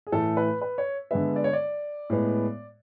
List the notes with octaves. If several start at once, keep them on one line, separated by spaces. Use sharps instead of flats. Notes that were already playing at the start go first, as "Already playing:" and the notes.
G#4
A2 E3 A3 A4
B4
B4
C#5
D3 G#3 B3 E5
D5
C#5
D5
A2 G#3 B3